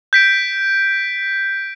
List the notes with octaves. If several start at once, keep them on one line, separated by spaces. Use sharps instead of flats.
G6 B6 D7